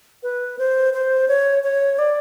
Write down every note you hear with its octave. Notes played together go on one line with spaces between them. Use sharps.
B4
C5
C5
C#5
C#5
D5